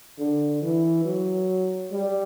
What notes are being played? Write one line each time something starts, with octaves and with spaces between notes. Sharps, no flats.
D3
E3
F#3
G3